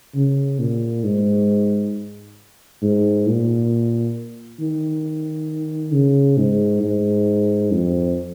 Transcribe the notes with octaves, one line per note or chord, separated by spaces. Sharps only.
C#3
A#2
G#2
G#2
A#2
D#3
C#3
G#2
G#2
F2